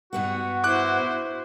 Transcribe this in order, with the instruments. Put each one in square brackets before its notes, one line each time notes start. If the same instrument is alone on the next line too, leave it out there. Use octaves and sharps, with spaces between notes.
[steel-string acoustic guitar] G2 B3 F#5 [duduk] F#4
[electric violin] E4 C5 [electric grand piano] D6 F#6